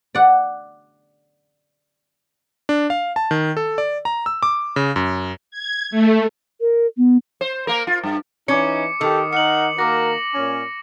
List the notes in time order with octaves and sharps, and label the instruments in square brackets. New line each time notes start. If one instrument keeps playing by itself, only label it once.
[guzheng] D5 F#5
[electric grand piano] D4
F5
A5
D#3
A4
D5
A#5
E6
D6
C#3
F#2
[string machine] G#6
A3
[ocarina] A#4
B3
[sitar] C5
A#3 A#4
F4
G2
[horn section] E3 D#4 [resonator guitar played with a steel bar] C#4 [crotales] D6 C#7
[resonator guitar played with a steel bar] D#3 [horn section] G4 A4
[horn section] D#4 A#4 F#5 [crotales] C#7 F#7
[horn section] A#3 F#4 A#4 [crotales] D6 A#6
[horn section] A#2 C#4